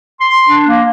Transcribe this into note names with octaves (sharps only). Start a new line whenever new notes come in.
C6
D4
A#3